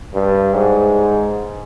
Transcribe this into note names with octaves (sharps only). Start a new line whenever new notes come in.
G2
G#2